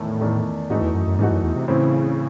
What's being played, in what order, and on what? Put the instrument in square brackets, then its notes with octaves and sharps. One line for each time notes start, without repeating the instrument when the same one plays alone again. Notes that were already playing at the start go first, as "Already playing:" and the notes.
Already playing: [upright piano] E2 D#3 A3 [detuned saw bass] A2
[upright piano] E2 D#3 A3
[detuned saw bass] G#2 [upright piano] E3 A3 D#4 F#4
[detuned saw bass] E2
F#2
F#2
[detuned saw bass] G#2 [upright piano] E3 A3 D#4 F#4
[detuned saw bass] F#2
E2
C3
[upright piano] A2 E3 C4 E4 C5 [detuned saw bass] C#3